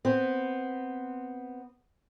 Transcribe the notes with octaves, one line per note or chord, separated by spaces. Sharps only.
B3 C4